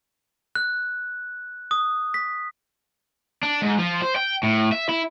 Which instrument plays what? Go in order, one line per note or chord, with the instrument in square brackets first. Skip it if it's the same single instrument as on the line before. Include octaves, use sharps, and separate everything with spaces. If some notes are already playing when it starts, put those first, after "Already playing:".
[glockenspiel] F#6
D#6
B6
[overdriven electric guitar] D4
G#2
F3
C5
G5
A2
E5
E4